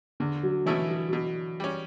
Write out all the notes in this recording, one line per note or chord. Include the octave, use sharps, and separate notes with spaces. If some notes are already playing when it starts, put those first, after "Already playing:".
E2 D3
F#3
B2 E3 A3 C#4 E4
F#3
F#3
B2
G3 C#4